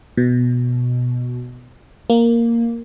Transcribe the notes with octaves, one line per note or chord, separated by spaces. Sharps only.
B2
A#3